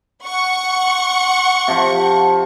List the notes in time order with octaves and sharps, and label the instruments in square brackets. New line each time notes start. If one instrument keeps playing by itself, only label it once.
[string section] F#5 C#6
[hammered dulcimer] C3 F3